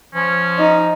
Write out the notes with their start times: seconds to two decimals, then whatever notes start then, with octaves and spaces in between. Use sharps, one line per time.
0.15 F3 C#4
0.59 D#4